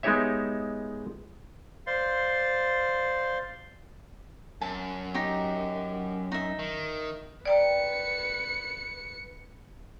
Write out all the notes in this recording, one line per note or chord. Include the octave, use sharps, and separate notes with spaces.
G#3 B3 D#4 G4 C#5 E5
C5 D5 F5 C6
F#2 A5
D#4 G4
D#4 E5
D#3
B4 D5 G5 A#5 C#7